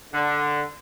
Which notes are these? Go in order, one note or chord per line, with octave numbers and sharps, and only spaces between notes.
D3